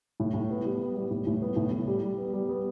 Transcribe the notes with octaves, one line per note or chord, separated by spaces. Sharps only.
A2
A2
B3
G3
B3
G3
A2
A2
B3
A2
A2
G3
G3
B3
G3
B3